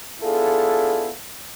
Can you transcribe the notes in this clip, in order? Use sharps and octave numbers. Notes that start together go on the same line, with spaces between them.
B3 D4 E4 F4 G#4 A4